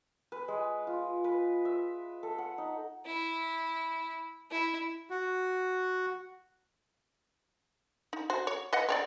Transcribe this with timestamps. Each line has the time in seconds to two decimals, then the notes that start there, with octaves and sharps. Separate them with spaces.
0.32 B4
0.48 G#3
0.87 F4
1.24 B4
1.65 E5
2.23 A4
2.38 F#5
2.58 D#4
3.05 E4
4.51 E4
5.10 F#4
8.13 D#4
8.30 F#4 C5
8.47 C#5
8.73 B4 D#5 F#5
8.89 C4 C#5 D5